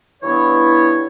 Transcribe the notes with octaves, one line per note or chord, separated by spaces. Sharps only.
G2 E3 B3 E4 C#5